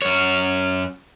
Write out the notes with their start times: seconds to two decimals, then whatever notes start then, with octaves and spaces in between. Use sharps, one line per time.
0.02 F#2 C#5